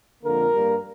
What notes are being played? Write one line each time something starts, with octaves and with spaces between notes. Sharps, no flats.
F2 D3 A#3 A#4
G2 G3 A#3